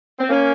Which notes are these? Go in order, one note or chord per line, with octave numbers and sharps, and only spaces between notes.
C4
A#3 C#4